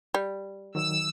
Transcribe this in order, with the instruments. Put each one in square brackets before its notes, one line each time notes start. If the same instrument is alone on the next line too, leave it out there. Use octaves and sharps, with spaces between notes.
[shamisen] G3
[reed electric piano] D#3 F#3 [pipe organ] E6